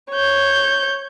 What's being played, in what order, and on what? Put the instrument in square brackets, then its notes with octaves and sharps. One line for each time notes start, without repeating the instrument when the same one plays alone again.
[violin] C#5 G6